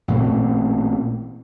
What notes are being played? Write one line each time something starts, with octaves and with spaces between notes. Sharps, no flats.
A1 A#2 A3 C4